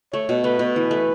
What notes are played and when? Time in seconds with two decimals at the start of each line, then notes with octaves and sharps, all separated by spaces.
0.13 A3 C#5
0.29 B2
0.44 A3 B4
0.59 B2
0.76 E3 B4
0.91 A3